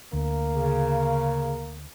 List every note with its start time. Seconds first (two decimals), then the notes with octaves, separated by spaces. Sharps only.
0.13 D2 A#3
0.55 C#3